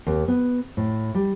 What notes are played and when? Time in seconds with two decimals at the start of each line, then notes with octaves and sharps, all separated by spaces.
0.07 D#2
0.28 B3
0.77 A2
1.15 G3